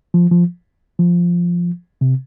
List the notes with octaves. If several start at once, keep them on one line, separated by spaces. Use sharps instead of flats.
F3
F3
F3
C3